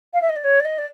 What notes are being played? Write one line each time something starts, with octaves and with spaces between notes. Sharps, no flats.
F5
E5
D#5
D5
C#5
D5
D#5
D5